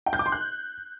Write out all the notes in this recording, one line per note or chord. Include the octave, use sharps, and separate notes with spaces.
G5
G6
D6
C6
F#6